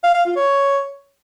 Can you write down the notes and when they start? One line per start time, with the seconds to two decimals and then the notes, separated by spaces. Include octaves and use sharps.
0.04 F5
0.14 F5
0.25 F4
0.36 C#5